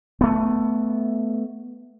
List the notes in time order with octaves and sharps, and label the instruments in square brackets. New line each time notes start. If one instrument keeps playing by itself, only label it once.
[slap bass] A3 B3